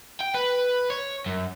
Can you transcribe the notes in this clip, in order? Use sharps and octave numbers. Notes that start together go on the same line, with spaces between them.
G5
B4
C#5
F#2